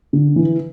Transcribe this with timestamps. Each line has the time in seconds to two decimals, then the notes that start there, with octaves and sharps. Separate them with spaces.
0.13 D3
0.36 E3